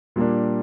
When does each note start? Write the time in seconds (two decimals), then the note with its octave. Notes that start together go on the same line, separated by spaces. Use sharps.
0.16 A#2 G3 A#3 D4